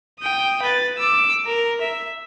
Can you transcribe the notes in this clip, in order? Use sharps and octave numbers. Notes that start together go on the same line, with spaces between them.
G5 D#6
B4 A6
D6 E6
A#4
E5